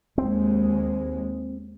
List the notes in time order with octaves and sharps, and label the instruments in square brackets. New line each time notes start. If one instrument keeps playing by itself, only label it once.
[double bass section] D#2 G#3 [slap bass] C4